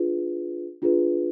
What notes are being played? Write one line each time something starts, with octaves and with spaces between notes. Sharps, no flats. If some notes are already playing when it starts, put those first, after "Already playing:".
Already playing: D4 F4 G#4 B4
D4 F4 G#4 B4